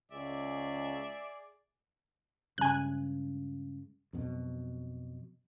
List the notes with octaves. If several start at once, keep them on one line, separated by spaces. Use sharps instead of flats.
C#2 G#4 D5 E5
G2 C#3 G#3 G#5 F#6
F2 B2 F#3